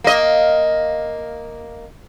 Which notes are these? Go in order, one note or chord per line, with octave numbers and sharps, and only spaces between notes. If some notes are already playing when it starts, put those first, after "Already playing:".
A#3 D#5